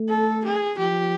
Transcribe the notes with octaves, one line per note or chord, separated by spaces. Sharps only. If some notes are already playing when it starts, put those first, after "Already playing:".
Already playing: A3
A4
G#4
F3 G4